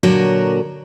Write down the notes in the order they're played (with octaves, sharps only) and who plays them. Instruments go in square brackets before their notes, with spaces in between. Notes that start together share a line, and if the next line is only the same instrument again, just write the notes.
[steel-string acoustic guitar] A#2 D3 F#3 F#4 A#4 C#5